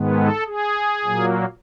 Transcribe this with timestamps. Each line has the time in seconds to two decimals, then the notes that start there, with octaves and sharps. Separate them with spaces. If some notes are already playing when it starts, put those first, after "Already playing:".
Already playing: G#2 D#3 G#3 B3
0.17 A4
0.47 G#4
1.04 A#2 F#3 A#3